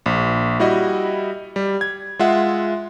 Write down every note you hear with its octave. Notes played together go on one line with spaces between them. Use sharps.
A#1
G3 E4 F#4 D#5
G3
G#6
G#3 F4 E5 F#5